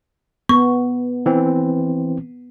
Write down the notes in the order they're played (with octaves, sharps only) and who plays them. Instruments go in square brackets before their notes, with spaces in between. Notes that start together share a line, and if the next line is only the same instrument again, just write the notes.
[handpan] B3 [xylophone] C#6
[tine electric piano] E3 C4